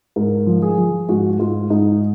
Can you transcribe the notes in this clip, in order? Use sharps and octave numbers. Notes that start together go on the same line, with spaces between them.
G#2 A#4
F3
G#4
F3
G#2 F#4
G#2 F4
G#2 D#4